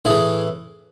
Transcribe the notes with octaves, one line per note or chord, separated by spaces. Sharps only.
A2 E3 E4 G#4